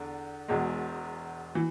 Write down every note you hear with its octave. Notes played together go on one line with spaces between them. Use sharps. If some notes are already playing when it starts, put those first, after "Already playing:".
Already playing: E2 D3
E1 E2 B2 G#3
E3